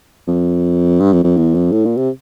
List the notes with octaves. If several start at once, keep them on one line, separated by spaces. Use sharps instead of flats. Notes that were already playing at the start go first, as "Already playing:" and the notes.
F2
G2
F2
F2
E2
F2
A2
A#2
C3